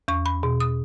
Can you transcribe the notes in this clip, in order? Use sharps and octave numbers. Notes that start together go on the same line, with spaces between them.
E2 C#6
B5
B2
D#6